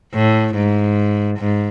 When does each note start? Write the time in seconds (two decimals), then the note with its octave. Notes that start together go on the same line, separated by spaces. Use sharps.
0.13 A2
0.55 G#2
1.39 G#2